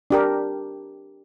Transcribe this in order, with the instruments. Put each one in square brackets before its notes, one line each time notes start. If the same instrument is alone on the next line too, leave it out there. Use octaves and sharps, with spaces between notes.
[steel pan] D4 G4 A#4